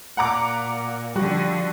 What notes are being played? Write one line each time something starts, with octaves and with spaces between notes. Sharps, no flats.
A#2 F#5 A#5 D6
D3 F3 G3 F#4